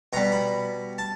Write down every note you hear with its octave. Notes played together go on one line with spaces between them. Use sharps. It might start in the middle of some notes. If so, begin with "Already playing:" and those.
B2 G3 A#5
B5
A5